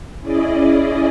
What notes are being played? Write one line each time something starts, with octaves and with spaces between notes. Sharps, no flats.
C#4 E4 G#4 D5 D#5